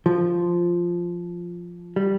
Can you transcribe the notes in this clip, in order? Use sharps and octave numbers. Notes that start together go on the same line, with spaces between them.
F3
G3